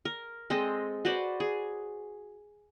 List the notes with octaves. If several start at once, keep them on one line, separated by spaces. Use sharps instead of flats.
A#4
G#3 C4 A4 D#5
F#4 B4 C5 D5
G#4